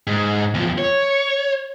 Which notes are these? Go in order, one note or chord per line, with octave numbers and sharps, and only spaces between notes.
G#2
E2 F3
C#5